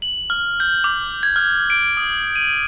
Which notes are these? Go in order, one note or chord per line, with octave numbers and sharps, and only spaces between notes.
F#7
F6
G6
D6
G#6
F6
D7
D#6
D#7